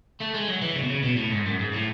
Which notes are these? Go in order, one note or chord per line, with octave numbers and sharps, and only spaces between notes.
A3
G#3
F#3
E3
C#3
B2
C#3
B2
A2
G#2
F#2
G#2
A2